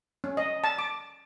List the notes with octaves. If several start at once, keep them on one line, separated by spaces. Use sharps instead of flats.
C#4
D#5
A5
D6